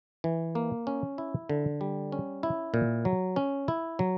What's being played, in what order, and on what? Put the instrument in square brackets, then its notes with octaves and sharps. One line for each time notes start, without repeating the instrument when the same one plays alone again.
[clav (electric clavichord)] E3
A#3
C#4
E4
D3
G3
C#4
E4
A#2
F#3
C#4
E4
F#3